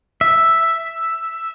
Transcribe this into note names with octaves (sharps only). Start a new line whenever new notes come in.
E5